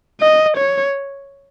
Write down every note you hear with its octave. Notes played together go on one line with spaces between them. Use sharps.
D#5
C#5